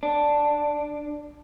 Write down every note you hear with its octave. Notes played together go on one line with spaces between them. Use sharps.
D4